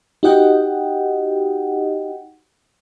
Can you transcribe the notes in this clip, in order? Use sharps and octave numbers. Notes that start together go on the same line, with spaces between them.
D#4 F#4 G4 D#5 F#5 G5